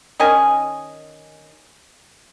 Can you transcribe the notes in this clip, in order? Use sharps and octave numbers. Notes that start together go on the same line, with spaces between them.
D#3 C#4 D#5 G#5